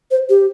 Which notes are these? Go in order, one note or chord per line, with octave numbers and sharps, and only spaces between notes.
C5
G4